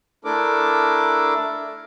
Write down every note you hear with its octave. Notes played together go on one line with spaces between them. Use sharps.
A3 D4 E4 A4 A#4 D6